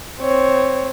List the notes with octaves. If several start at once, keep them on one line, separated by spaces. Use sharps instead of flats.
C4 C#5